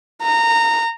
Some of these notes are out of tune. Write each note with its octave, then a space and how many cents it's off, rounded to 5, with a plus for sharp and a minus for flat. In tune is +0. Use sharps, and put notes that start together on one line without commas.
A#5 -20